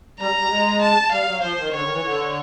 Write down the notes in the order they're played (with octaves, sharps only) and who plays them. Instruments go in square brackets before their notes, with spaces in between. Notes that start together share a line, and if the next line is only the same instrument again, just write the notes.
[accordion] G3 [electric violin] A#5
[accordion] G3
G#3
[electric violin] A5
[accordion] G3 [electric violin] F5
[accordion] F#3
[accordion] F3 [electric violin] C5
[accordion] D#3
[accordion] D3 [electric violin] C#5
[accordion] D#3
E3
D3